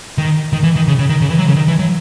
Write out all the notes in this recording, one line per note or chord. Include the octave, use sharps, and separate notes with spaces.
D#3
D#3
E3
D#3
C#3
C#3
D#3
C#3
E3
F#3
C#3
D#3
E3
F#3